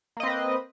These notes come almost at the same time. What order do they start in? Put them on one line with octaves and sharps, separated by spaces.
A#3 D#5 C4 B4